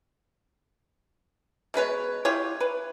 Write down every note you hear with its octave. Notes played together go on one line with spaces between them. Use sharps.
B2 G#3 B4 C#5
E4 F4 G4 C#5
B4